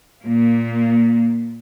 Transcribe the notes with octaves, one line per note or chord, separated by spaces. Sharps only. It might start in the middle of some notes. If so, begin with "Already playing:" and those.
A#2 A#3